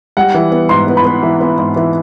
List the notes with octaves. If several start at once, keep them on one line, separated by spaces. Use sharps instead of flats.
G3 F#5
E3
B3
G#2 C6
B3
B5
B3
E3
B3
G#2
E3